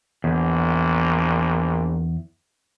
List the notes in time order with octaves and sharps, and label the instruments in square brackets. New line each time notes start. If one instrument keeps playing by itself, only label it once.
[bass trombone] A#1 [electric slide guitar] E2